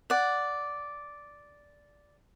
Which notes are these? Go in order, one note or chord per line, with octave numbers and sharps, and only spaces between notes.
D5 F#5